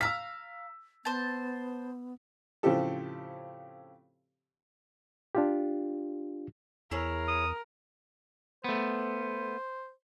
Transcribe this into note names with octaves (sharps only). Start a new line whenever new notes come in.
F5 A#5 E6 B6
B3 C5 A5
A2 C#3 F3 C4 G4 A4
D4 F4 G4
E2 E4 G#4 A#4 C#5
D#6
A3 B3 C5